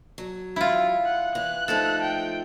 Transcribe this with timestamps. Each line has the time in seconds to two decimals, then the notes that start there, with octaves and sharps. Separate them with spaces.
0.18 F#3
0.56 E4 F4
1.05 F#5
1.35 E3 F#6
1.68 F3 A3 D#4 A4
2.02 G5